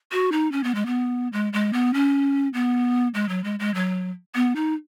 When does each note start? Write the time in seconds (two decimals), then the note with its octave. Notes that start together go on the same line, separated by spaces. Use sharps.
0.12 F#4
0.32 D#4
0.52 C#4
0.64 B3
0.75 G#3
0.86 B3
1.33 G#3
1.53 G#3
1.73 B3
1.94 C#4
2.54 B3
3.14 G#3
3.29 F#3
3.44 G#3
3.60 G#3
3.75 F#3
4.35 B3
4.56 D#4